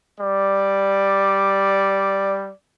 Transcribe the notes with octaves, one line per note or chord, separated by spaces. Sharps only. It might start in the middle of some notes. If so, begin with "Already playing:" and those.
G3 D5